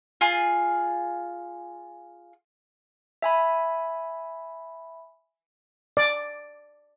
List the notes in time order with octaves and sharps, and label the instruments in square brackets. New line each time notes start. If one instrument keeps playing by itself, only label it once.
[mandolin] F4 G#4
[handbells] E5 G#5 B5
[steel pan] D5